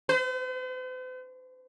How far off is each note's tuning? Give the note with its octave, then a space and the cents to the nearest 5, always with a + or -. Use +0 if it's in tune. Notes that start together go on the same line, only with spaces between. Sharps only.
C5 -45